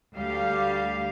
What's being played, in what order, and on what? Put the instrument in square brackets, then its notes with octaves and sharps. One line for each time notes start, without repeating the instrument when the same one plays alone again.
[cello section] D2 G3 G4 F5